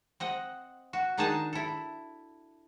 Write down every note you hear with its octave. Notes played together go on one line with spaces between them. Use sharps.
C4 D#5 F#5
F#4
D#3 D4 D#4 G#4 D#5 A5
E4 A4